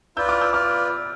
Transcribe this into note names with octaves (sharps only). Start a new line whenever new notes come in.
F4 B4 D5 E6 G6
D6 F6
E6 G6
F4 B4 D5 D6 F6